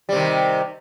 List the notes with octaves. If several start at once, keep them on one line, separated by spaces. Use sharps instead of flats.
C3 D#3 G3